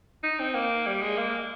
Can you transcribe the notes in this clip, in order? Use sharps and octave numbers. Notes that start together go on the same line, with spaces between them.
D#4
C4
A#3
G3
G#3
A#3